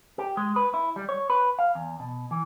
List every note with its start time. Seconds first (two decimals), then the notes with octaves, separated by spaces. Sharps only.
0.18 G4
0.37 G#3
0.56 B4
0.74 E4
0.96 G3
1.09 C#5
1.30 B4
1.59 F5
1.75 E2
2.00 B2
2.31 E3